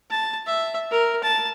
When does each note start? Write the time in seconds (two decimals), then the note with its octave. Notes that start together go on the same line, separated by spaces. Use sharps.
0.11 A5
0.47 E5
0.91 A#4
1.23 A5